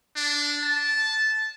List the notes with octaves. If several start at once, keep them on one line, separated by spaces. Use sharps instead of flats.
D4
A5